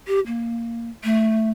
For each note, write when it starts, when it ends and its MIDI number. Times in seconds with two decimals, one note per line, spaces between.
0.07 0.20 67
0.27 0.90 58
1.04 1.50 57